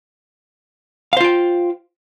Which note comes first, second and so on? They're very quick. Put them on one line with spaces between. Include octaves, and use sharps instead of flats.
F5 C5 F4 G5